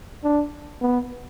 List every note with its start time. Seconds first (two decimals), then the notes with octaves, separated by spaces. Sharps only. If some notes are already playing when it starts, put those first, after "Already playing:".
0.24 D4
0.82 B3